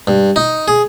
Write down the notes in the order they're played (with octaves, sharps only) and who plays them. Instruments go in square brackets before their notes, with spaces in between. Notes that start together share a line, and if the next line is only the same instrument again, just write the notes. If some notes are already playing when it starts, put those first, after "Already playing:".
[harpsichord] G2
D#4
G#4